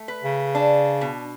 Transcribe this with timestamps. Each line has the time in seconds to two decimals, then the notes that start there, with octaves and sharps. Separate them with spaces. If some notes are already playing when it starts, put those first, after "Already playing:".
Already playing: A3
0.08 B4
0.23 C#3
0.55 D4
1.01 B2